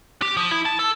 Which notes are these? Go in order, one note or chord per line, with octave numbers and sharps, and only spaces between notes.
G4
F3
E4
A5
A4